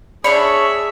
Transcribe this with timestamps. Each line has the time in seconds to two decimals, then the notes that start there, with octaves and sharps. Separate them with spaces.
0.24 D4 G#4 C#5 D5 E5 B5 C#6